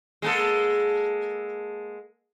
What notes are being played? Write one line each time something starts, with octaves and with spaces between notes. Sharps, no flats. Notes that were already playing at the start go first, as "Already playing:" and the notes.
G#3 A#3 A4